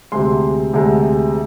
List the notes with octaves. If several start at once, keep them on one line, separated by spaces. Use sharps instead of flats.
D2 C3 G#3 C6
D2 C3 G#3